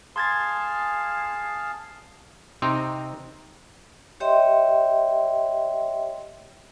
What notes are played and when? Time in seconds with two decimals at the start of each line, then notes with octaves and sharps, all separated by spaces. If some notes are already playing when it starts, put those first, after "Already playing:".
0.16 G#4 F5 A5 C6 G#6 A6
2.62 C3 C4 D#4 G5 A#5
4.20 G4 C#5 D#5 E5 G5 C6